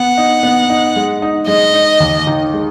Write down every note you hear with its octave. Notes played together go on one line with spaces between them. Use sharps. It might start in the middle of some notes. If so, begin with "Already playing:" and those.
Already playing: B3 F#5
D#4
B3
D#4
G#3
D#4
G#3 D#5
D#4
D#2
D#3
G#3